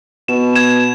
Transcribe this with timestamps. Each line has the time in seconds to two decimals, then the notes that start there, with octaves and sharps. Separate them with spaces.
0.28 B2 E7
0.56 G#6 E7